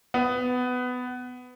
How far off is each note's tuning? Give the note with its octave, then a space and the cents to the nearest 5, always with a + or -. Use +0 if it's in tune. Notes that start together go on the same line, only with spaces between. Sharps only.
B3 +15